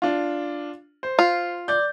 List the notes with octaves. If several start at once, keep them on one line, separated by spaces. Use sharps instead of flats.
D4 F4
C5
F4
D5 G6